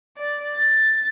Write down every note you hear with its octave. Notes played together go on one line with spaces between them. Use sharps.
D5
A6